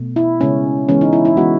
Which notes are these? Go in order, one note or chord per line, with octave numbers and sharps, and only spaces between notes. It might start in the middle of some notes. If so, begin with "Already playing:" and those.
Already playing: B2 A3
E4
C#3 G#3 B3 C#4
E3 G#3 B3 C#4
D#4
E4
E4
E3 G#3 B3 F#4